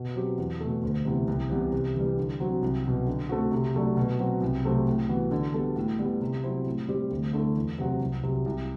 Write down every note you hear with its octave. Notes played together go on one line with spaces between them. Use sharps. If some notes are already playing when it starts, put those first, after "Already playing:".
Already playing: B2
F#3 C4 G4
E2
B2 A3
D2
C3 E3 B3 E4
C2
C3 E3 G3 B3
C3
E3 G3
D3
F#3 C4 F#4
C2
B2 F#3
D3
A3 C4 F#4
C3
F#3 A3 D4
B2
F#3 C4 F#4
C2
C3 F#3 A3 C4
A2
E3 B3 F#4
D3
G3 B3 F#4 A4
A2
G3 B3
C3
F#3 C4 E4
A2
G3 C4 G4
D2
D3 A3 E4 A4
E2
C3 F#3 C4 F#4
C2
C3 F#3
C2